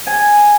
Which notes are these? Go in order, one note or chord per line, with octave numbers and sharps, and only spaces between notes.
G#5